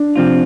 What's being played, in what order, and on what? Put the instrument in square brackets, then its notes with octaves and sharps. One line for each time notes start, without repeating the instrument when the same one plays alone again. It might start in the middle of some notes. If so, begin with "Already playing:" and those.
Already playing: [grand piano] D4
[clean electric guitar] C3 F3 C4 F4